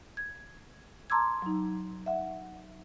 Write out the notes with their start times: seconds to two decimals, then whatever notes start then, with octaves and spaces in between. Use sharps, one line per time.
0.17 G#6
1.10 A5 A#5 C6 D6 E6 G#6
1.42 F#3 D#4
2.06 E5 F#5